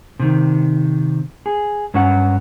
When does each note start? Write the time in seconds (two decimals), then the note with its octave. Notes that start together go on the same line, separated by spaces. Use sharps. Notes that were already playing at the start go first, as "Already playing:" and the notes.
0.20 C3 D#3
1.46 G#4
1.94 G2 F#3 C#4 F#4 F#5